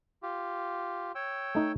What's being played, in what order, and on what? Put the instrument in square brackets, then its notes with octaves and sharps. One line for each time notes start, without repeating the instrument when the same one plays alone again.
[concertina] F4 G4
C#5 G5 E6
[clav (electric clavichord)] A3 D#4